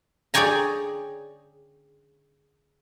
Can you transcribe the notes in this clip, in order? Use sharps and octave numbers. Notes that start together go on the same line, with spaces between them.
G#4 C#5 D5 G5 G#5 A#5